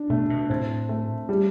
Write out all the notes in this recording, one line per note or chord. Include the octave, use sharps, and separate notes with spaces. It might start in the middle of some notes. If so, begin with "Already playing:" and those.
Already playing: D4
B2 A3
B2
A2 C4
A3
G3